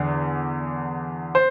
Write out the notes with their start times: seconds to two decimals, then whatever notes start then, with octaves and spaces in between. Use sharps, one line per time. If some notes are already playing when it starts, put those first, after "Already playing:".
Already playing: E2 D3
1.35 C5